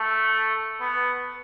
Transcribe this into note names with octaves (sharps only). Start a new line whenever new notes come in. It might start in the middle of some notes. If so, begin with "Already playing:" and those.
Already playing: A3
B3